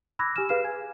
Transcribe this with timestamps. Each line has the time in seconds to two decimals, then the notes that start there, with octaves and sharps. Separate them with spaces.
0.19 B5 D6 E6 F#6 G#6 A#6
0.36 G4 G#5 E6 F6 E7
0.49 G#4 B4 F5 F6 C7 E7
0.64 G#5 G#6